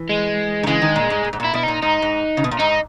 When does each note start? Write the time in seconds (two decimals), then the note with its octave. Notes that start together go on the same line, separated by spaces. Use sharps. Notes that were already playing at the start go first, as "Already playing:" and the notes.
Already playing: E3
0.09 G#3
0.63 D#3
0.67 C#3 E3 G#3
0.82 D#3
0.96 A#2
1.10 G#2
1.24 A#2
1.33 G#2
1.40 A#2 E4
1.53 B2 E4
1.63 A#2 D#4
1.82 G#2 D#4
2.02 G#2
2.37 C#3
2.44 B2
2.51 A#2
2.60 G#2 D#4